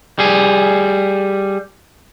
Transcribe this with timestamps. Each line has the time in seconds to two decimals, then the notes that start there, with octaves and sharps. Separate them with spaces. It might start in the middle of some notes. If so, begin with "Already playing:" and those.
0.19 G3 G#4